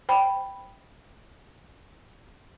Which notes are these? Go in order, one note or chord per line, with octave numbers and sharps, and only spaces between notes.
C5 G5 B5